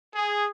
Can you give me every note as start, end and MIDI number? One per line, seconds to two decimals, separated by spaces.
0.15 0.46 68